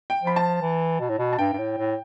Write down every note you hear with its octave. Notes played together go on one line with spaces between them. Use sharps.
G5
F3 B5
A5
E3
B2
A2
B2
A5
G2 G5
G2
A2
A2